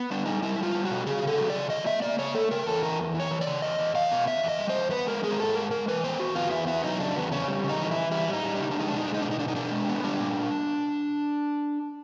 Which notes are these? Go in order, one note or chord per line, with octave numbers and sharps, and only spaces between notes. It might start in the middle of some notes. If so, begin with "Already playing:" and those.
Already playing: B3
G3 D4
G3 D#4
G3 E4
G3 F4
G3
B2 F#4
C#3 G#4
C#3 A4
F#3
D5
C#3
F#3 D#5
A#3 E5
A#3 D5
C#3 C#5
A3 A4
C#3 A#4
E2 A4
E3 A#4
E2
E3
C#5
E3
D5
C#3
E2 D#5
E2
E2 F5
B2
E2 E5
E2
D#5
G3
C5
E2
B3 B4
G#3 A#4
G#3 G#4
A#4
G#2 A4
G#3 A#4
G#3 A#4
E3 B4
B3 C5
E2 F#4
B3 F4
E2 E4
B3 E4
F#3 D#4
C#3 D4
E2 B3
C#3 C#4
G3
C#3
D#4
E3
E3 E4
G3 E4
G3
D#4
G3
D4
C#3 D#4
D4
G#3 D#4
D4
B2 D#4
G#3 D4
D#4
B2 D4
D#4
B2 D4
D#4
B2 D4
G#3
B3
G3 D4
A#2
A#2